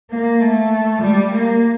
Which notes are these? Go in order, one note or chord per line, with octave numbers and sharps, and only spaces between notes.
A#3
A3
G3
A#3